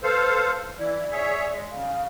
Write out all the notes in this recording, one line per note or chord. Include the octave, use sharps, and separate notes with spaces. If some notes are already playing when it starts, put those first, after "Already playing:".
A4 B4 C5 F5
E3 E4 D5
G#4 C#5 E5
G#3
C#3 F5